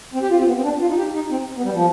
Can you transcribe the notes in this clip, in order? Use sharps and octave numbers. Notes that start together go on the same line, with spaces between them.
C4
G4
F4
C4
B3
C4
D4
F4
D#4
G4
D#4
C4
B3
G3
F3